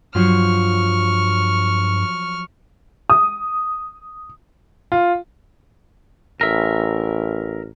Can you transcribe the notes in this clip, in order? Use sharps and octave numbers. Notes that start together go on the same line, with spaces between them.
G2 F3 F#3 F4 C#6 F6
D#6
F4
A1 A#4 E5